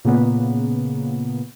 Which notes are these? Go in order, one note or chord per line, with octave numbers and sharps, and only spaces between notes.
A#2 C#3 A#3 B3